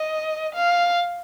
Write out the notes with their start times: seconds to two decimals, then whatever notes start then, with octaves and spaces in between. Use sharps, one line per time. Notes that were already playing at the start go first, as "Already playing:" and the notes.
Already playing: D#5
0.55 F5